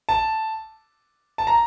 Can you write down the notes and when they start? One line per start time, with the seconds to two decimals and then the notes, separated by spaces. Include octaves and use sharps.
0.09 A5
1.38 A5
1.47 A#5